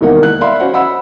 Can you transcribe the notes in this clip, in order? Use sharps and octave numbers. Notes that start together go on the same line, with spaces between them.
E1 C2 D#3 A#3 D#4 F#5
F#6
D5 E5 F5 B5 C6
C#4 F#4 C5 F#5
D#5 F#5 B5 E6